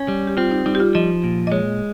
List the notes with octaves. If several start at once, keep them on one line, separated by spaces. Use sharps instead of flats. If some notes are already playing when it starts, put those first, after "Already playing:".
Already playing: C#4
G3
G4
C4 F4
D#4
G3 D#4
G4
F4
F3 D#5
A#2
D#5
G#3 C#5